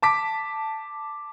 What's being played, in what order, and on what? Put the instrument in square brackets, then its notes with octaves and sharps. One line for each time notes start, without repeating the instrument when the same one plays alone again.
[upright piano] A5 D6 B6